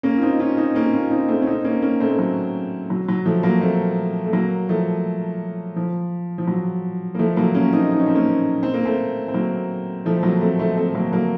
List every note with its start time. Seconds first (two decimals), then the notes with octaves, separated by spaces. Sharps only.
0.03 A#3 C#4
0.18 F4
0.22 C4 D#4
0.40 C#4 F4
0.57 C4 D#4
0.75 A#3 C#4
0.93 C#4 F4
1.11 C4 D#4
1.28 A3 C4
1.42 C#4
1.47 C4 D#4
1.64 A#3 C#4
1.82 A#3 C#4
2.00 A3 C4
2.11 A3
2.19 F#3
2.90 F#3
3.08 F#3
3.26 F3 A3
3.43 F#3 A#3
3.61 A3 C4
4.26 A3
4.33 F#3 A#3
4.69 F3 A3
5.76 F3
6.38 F3
6.47 F#3
7.15 A#3
7.19 F3 A3
7.37 F#3 A#3
7.54 A#3 C#4
7.73 C4 D#4
7.91 D#4
7.99 C#4
8.06 C4
8.15 A#3 C#4
8.63 C4
8.74 A#3
8.85 A3 C4
9.28 C4
9.34 F#3 A#3
10.05 F3 A3
10.17 C4
10.23 F#3 A#3
10.41 A3 C4
10.59 A3 C4
10.77 A3 C4
10.95 F#3 A#3
11.12 F#3 A#3